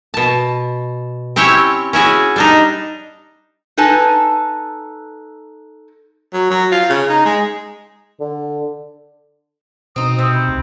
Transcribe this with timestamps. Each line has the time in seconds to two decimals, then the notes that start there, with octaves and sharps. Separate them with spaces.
0.14 B2 A5
1.36 C4 C#4 E4 G4 C#5
1.93 C#4 E4 F#4 G#4
2.36 G3 D4 D#4
3.77 D#4 A4 B4 G#5 A5
6.33 F#3
6.50 F#3
6.72 F4
6.89 C#3
7.09 D#4
7.25 G#3
8.20 D3
9.96 B2 C4 D#4 D#6
10.18 C3 C4
10.35 B5
10.48 D2